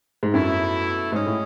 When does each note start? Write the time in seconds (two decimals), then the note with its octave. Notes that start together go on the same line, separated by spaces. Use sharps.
0.23 G#2
0.34 F#2 B2 A3 E4
1.12 G#2 C#4 G#4 D#5
1.26 A2